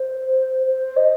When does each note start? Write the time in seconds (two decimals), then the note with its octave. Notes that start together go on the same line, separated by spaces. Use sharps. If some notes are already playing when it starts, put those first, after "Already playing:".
Already playing: C5
0.66 C5
0.96 D#5